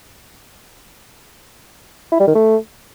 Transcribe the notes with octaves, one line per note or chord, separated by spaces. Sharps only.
E4
G3
D#3
A3